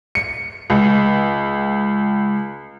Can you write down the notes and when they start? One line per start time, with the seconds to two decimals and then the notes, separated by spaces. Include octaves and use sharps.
0.15 C#7
0.70 C#2